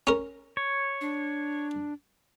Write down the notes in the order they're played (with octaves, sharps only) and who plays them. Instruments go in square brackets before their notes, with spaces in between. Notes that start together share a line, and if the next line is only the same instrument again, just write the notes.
[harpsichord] C#4 A#4
[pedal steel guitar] C#5
[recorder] D4